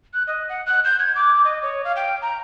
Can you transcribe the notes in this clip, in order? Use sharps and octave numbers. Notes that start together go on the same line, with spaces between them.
F#6
D#5
F#5
F#6
G6
G#6
D6
D#5
C#5
F5
G5
A#5